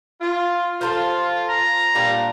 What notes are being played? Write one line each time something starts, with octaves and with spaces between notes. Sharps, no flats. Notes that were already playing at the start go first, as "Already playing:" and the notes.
F4
F4 A4 A#4 C5
A#5
A#2 G3 D4 F5